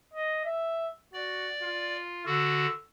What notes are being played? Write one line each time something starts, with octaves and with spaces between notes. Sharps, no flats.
D#5
E5
F#4 D5
F4
D3 F#4 E6